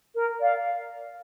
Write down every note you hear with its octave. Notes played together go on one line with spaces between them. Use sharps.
A#4
D5 F5